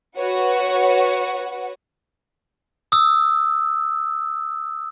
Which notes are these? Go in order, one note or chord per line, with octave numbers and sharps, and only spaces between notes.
F#4 B4 C#5 F#5
D#6 E6